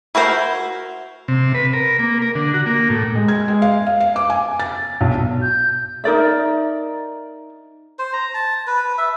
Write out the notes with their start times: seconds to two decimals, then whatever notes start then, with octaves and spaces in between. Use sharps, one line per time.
0.15 E4 F#4 A#4 C5
1.28 C3
1.55 B4
1.73 A#4
1.99 A#3
2.22 A#4
2.35 D3
2.54 F#4
2.66 A#3
2.90 A2
3.15 G#3
3.28 G#6
3.48 G#3
3.62 F5
3.86 F5
4.00 F5
4.16 D6
4.30 G#5
4.60 A6
5.01 B1
5.42 G6
6.04 D#4 A#4 D5 E5
7.99 C5
8.13 A#5
8.34 A5
8.67 B4
8.98 E5